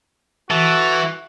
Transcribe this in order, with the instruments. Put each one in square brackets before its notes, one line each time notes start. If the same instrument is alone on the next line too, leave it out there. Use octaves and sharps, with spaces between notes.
[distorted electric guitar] E3 [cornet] F#4 [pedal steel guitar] A4